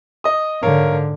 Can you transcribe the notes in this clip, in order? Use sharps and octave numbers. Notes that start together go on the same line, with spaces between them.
D#5 D#6
G#2 D3 A#4 C#5 F5